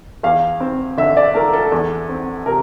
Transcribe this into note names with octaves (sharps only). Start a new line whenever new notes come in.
E2 F5
C4
D3 E5
D5
A3 A#4
A4
E2
C4
C3 A#4